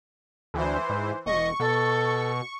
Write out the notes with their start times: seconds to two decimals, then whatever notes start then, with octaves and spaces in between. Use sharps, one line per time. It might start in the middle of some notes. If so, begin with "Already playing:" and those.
0.54 D2 E3 C5
0.90 G#2
1.26 E1 D#5 C#6
1.60 B2 A4